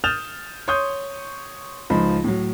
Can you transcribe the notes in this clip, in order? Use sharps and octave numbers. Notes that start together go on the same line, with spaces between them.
D#6 F6 G6 A6 E7 F7
C#5 C6 C#6 D#6 G6
C#2 F3 D#4 B5 C6
A2 F#3